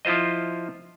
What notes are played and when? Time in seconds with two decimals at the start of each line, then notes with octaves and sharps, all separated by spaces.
0.05 F3 E4 F4 C5 D#5